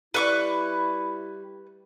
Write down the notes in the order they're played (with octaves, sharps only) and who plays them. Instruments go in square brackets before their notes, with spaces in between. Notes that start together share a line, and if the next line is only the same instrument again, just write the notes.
[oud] G3 [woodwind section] E4 [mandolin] B4 C#6 D6